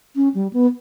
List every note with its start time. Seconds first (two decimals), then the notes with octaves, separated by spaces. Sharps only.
0.16 C#4
0.35 G3
0.53 B3